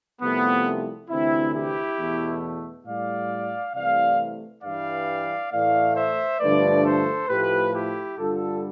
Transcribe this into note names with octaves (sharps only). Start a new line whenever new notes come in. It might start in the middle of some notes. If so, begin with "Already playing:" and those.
C2 C3 F3 A3 B3
D2 C3 E3 C4 E4
E4 G4
E2 B2 A3
A2 G3 D5 F5
C2 C3 E3 A3 D5 F5
G2 E3 G3 D5 F5
A2 E3 A3 D5 F5
C5 E5
G2 D3 F3 A3 B4 D5
A4 C5
A2 F3 A3 G4 B4
E4 G4
G2 D3 G3 F4 A4